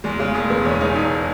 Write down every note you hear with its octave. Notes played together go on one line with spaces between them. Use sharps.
E2 G#3
C#3 G#3
E1 G#3
E1 B3
E2 C#4
C#3 D#4
E1 D#4